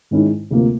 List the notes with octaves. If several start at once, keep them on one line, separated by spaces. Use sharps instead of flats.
G#2 D#3 G#3 C#4 E4
D2 C3 F3 A#3